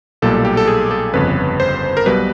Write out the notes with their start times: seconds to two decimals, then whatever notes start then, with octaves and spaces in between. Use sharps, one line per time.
0.22 B1 A#2 G3 A4
0.45 G4
0.57 A4
0.67 G#4
0.91 A4
1.14 G1 F2 C#3 B4
1.60 C5
1.97 A#4
2.06 B1 B2 G3 B4